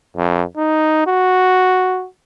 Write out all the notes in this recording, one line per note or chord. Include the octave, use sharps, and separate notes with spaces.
F2
D#4
F#4